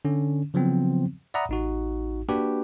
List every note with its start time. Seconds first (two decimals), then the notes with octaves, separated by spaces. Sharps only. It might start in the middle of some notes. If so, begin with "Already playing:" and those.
0.05 D3 C#4
0.54 C#3 F3 F#3 B3 C4
1.34 D5 E5 F#5 A#5 B5 D#6
1.49 A1 D#4 F#4
2.29 A#3 D4 F#4 G4 B4